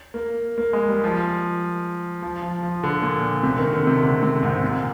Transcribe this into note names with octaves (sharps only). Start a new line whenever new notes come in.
A#3
A#3
G#3
G3
F3
F3
F3
F3
D3
A#2
C3
D#3
D3
C3
D3
C3
G#2
A#2